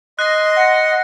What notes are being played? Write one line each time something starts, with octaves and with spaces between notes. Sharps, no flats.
D#5 C6 F#6 A#6
F#5